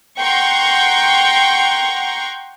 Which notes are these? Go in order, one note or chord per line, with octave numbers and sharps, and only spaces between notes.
F#5 G5 A#5 C6 C#6